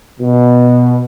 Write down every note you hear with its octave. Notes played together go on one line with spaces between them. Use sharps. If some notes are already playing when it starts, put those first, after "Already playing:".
B2